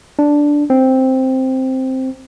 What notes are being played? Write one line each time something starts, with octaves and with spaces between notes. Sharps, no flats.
D4
C4